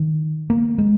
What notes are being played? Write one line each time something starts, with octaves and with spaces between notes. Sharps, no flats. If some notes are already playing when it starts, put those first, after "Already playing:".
Already playing: D#3
A#3
G#3